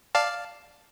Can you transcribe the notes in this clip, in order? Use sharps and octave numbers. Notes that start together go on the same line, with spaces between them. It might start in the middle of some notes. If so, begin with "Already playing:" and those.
D5 F5 A5